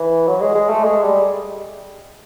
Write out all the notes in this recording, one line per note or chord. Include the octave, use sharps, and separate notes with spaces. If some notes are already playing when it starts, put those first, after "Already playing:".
Already playing: E3
F#3
G#3
G#3
A3
G#3
G3